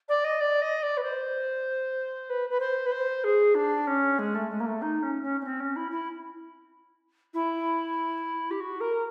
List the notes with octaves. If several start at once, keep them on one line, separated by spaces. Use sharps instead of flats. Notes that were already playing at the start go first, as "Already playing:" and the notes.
D5
D#5
D5
D#5
D5
B4
C5
B4
B4
C5
B4
C5
G#4
D4
C#4
G#3
A3
G#3
A#3
A3
D#4
C#4
C#4
C#4
C4
C#4
E4
E4
E4
G4
F#4
A#4